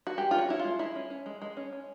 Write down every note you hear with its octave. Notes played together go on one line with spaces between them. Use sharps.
F#4
G#3 G4
C#4 F4
F#4
C#4 E4
F4
G#3
G#3 E4
C#4
C#4
G#3
G#3
C#4
C#4